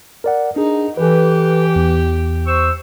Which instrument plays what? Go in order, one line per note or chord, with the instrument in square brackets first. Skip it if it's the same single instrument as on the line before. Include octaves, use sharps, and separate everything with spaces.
[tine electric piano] A#4 D5 F#5
[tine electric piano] D4 G#4 [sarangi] D#4
[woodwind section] E3 [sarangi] G4 [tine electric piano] A4 B4
[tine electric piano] E2
[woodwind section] C5 C#6 E6